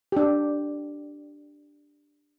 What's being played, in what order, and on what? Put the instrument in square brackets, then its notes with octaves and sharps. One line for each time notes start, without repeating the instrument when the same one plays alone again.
[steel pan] D4 G4